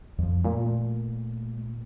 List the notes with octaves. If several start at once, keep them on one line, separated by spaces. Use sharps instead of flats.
F2 F3
A#2 A3